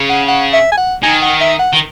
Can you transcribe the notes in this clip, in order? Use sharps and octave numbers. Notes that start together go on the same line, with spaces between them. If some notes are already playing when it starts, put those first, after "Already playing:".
Already playing: C#3
F#5
F#5
E5
G#5
F#5
D#3 G#5
F#5
E5
F#5
D#3